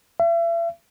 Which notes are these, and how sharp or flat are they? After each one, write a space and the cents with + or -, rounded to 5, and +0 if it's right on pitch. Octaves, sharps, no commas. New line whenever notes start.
E5 +40